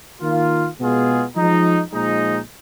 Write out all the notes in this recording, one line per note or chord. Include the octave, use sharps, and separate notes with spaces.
D#3 A#3 F4
B2 G#3 B3 F4 G#4
F3 G#3 D#4
A#2 F3 G#3 D#4